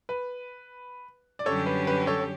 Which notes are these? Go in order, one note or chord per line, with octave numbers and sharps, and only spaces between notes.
B4
D5
F#2 D3 G3 C#4 G4 A4 C#5
B4
B4
A4 C#5